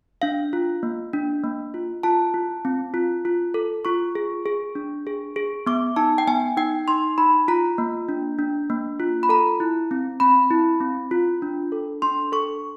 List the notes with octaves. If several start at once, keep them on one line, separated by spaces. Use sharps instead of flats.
D4 F5
F4
A#3
D4
A#3
F4
F4 A5
F4
C4
F4
F4
A4
F4 C#6
G#4
G#4
D4
G#4
G#4
B3 D6
D#4 A5
G5
B3 G#5
D#4 G5
D#4 C6
D#4 B5
F4 A#5
A#3
D4
D4
A#3
F4
B5
A4 A#5
E4
C4
C4 B5
E4
C4
F4
D4
A4
D4 C6
A4 C#6